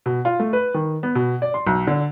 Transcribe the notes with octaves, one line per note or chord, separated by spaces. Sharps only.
B2
F4
A3
B4
D#3
B3
B2
D5
C6
B1
D3